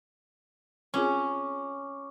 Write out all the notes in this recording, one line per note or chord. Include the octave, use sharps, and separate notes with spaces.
C4 C#4 F4 G#4 C#6 D6